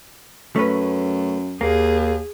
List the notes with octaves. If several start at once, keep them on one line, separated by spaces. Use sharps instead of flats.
F#2 A3 C#4 B4
D#2 A#3 G#4